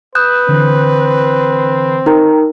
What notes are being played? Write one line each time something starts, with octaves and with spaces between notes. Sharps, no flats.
B4 D#6 F#6 G6 E7
D3 E3 C4
D#4 A#4 G5 A#5